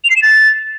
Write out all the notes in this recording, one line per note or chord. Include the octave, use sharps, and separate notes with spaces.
F7
C7
E7
A6